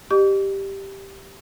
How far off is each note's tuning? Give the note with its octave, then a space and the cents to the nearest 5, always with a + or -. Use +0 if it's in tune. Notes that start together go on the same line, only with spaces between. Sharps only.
G4 +0 D#5 -40 D6 -45